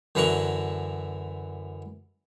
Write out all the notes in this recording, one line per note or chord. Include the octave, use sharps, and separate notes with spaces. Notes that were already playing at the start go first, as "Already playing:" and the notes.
F#2 D3 E3 F#5 A#5 C#6